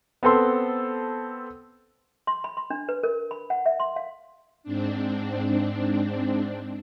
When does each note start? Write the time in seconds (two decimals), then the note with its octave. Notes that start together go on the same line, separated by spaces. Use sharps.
0.23 B3 C4 A4 C6
2.27 C6
2.44 B5
2.57 C6
2.70 D4
2.89 B4
3.03 A#4
3.31 B5
3.50 F#5
3.66 E5
3.80 C6
3.96 F5
4.63 G#2 C4 D4